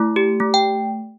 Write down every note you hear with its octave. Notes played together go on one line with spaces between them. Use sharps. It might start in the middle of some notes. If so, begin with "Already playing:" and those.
Already playing: A3 E4
G4
A3
G5